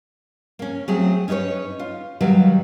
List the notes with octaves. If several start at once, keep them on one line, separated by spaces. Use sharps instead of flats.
A#3 C#4
F#3 A3 C4 G#4
C#4 D#4 A4 B4 C#5
F4
D#3 F#3 G3 B4 F5